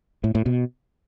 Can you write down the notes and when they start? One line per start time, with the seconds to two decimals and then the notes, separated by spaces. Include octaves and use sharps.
0.24 A2
0.35 A2
0.46 B2